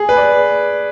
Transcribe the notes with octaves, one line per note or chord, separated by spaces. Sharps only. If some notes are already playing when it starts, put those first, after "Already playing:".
Already playing: G#4
B4
D5